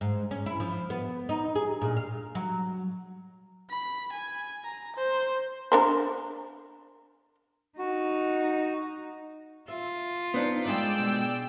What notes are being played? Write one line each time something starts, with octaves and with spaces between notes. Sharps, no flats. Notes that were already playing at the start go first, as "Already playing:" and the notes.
G#2
C#4
E4
F3
B3
D#4
G#4
A#2
F5
F#3
B5
G#5
A#5
C5
D4 A#4 C5
D#4 F#4
F4 E5
B3 C4 D4 D#4
G#3 G#4 D5 D#5 G5 E6
B2